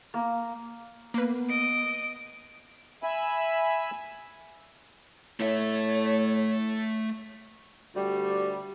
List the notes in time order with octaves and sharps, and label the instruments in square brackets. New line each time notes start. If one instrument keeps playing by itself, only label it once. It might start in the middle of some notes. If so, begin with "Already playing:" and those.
[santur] A#3
[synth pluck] A#3 B4 [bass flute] B3
[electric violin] D#5 D7
[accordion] E5 G#5 B5
[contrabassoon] A2 [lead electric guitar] A3 E5 [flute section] C#5
[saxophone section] D2 G3